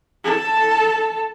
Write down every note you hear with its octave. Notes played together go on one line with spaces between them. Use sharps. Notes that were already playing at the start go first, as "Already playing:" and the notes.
A4 A5